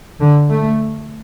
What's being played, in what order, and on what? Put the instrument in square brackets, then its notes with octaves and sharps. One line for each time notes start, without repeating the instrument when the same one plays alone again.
[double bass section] D3
A3